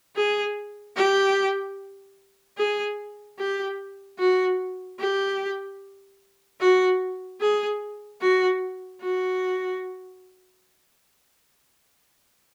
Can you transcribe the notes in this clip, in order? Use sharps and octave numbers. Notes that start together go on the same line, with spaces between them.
G#4
G4
G#4
G4
F#4
G4
F#4
G#4
F#4
F#4